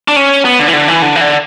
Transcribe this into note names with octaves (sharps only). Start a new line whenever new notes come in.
D4
C#4
B3
D3
E3
D3
E3
D3
E3
D3